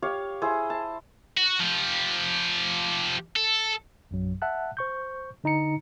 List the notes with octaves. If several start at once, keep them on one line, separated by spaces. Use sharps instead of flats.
G4 C#5 F5
E4 G#4 C5
A5
F#4
F3 G4
A4
A#1 F#2 F#3
E5 F#5 A5 F#6
C5 C#6 G6
D3 D#4 A#5 C#7